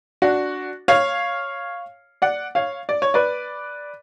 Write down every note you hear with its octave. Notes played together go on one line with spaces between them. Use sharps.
D4 F#4
C#5 F5
D5 F#5
C#5 F5
D5
C#5
B4 D5